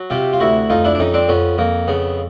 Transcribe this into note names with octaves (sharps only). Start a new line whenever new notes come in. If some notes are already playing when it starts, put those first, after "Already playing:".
Already playing: F#3
C3 F4 G4
F4
D2 E4 F#4
F2 D#4 F4
D4 E4
D4
F2 C#4 D#4
C4 D4
F2 B3 C#4
F2 A#3
C#3 B3